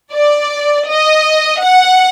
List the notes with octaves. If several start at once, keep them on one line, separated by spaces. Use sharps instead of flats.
D5
D#5
F#5